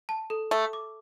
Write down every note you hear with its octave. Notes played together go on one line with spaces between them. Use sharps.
A5
A4
A3 A4
D6